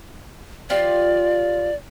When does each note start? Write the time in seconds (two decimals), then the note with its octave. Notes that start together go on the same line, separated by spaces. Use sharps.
0.70 F3 F4 G4 D5